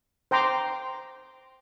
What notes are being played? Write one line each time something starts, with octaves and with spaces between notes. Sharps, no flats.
C5 G5 A#5 C6 D6